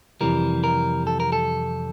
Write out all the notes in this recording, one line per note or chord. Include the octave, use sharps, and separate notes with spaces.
F2 C3 E3 G3 A#4
A#4
A4
A#4
A4